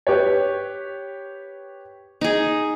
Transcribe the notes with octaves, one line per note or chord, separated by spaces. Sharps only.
G4 B4 C#5
D#4 G#4